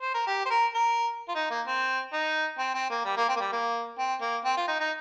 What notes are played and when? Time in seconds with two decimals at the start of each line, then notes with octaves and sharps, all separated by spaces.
0.02 C5
0.14 A#4
0.27 G4
0.45 C5
0.50 A#4
0.74 A#4
1.28 F4
1.35 D#4
1.50 A#3
1.67 C4
2.13 D#4
2.59 C4
2.74 C4
2.90 A#3
3.05 G3
3.17 A#3
3.29 C4
3.36 A#3
3.40 G3
3.52 A#3
3.98 C4
4.21 A#3
4.45 C4
4.57 F4
4.67 D#4
4.80 D#4